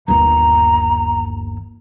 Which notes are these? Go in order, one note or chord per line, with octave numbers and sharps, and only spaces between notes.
G1 D#2 A#5